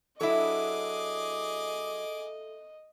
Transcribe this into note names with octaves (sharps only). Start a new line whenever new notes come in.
F#3 D4 E4 G#4 A4 D#5 E5 D6